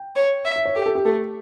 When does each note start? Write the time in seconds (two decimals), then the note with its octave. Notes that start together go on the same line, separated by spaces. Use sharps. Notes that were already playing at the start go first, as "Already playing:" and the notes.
Already playing: G5
0.16 C#5
0.45 E5
0.56 E5
0.65 C#5
0.75 G4 A4
0.86 A4
0.95 G4
1.05 A3 A4